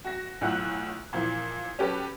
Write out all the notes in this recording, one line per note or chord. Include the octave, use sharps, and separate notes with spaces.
F#4 A#6
B1 A2 F4 F#5 E6 F#6
A#2 E3 F3
C#4 F#4 G4 A4 B4